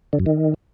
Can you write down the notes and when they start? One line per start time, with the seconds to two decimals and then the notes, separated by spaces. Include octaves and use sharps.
0.13 D3
0.19 F#2
0.26 D#3